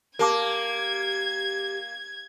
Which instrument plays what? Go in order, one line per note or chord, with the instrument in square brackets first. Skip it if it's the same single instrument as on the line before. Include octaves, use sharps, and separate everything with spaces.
[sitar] A#3 [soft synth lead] G4 [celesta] A#4 A5 D6 [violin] G#6